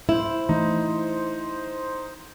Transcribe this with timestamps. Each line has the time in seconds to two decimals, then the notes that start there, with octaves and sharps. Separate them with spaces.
0.09 E4 C5
0.49 E3 A3 D#4